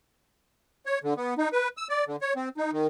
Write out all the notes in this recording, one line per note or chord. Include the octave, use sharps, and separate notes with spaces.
C#5
D3
B3
D#4
B4
E6
D5
D3
C#5
C4
D#4
D#3